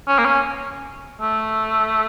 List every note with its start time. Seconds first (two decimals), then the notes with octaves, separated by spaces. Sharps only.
0.08 C#4
0.18 A#3
0.25 C#4
1.21 A3